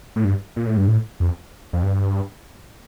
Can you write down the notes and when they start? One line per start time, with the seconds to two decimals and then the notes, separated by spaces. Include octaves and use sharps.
0.16 A2
0.24 G2
0.56 A#2
0.67 A2
0.77 G2
0.88 A2
1.20 F2
1.73 F2
1.83 G2